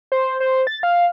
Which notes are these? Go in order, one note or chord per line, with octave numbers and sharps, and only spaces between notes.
C5
C5
A6
F5